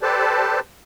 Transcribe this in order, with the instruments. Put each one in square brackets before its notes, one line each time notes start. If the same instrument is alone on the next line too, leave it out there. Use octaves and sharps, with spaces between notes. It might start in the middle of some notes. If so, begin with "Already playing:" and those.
[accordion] G4 A4 B4 C5 D5 A5